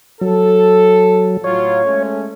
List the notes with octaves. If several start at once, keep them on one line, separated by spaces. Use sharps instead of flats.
F#3 A4
A2 F#3 F4 C#5
G#3 A3 C#4